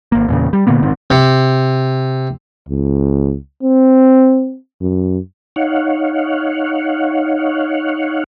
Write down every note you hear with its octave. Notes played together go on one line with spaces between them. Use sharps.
G#1 A#3
E2 A#2 C#3
G3
A#2 D3 A#3 B3
A#1 G#2 D#3 C4
C3
C#2
C4
F#2
D#4 C#5 F5 F#5